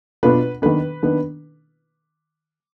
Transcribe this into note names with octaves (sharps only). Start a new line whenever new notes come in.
B2 B3 D4 F4 B4
D#3 B3 D4 B4
D#3 B3 D4